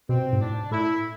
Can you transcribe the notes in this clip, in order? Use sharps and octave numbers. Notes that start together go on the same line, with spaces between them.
B2 C4
G#2
A2 D4
A2 E4